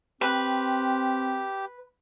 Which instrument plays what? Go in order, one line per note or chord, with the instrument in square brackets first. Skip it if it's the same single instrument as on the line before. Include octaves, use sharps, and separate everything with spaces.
[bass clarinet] C4 [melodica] G4 [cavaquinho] B4